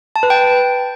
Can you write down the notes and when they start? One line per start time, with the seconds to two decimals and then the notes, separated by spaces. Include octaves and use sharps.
0.16 A5
0.23 B4
0.30 G5